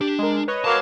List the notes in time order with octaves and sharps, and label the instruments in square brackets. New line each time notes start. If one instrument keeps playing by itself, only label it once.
[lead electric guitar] D4 [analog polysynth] G4
[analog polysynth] G#3 A#4
B4 C#5 D#5
[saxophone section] F#3 A#3 [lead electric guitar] A5